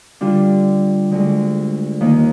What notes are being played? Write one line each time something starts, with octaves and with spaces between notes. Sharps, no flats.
D3 G3 D4 F4
D2 D3 G#3
D#2 D#3 A#3